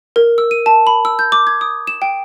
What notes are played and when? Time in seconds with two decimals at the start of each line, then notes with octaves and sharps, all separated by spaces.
0.16 A#4
0.38 E6
0.51 D#7
0.66 A5
0.87 B5
1.05 E6
1.19 G6
1.32 D6
1.47 G#6
1.61 D#6
1.87 E7
2.02 G5